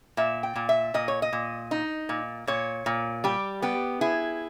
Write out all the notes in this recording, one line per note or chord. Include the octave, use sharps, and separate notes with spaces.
A#2 E5
G5
A#2
E5
A#2 D#5
C#5
D#5
A#2
D#4
A#2
A#2 C#5
A#2
G3 G4
B3 G4
E4 G#4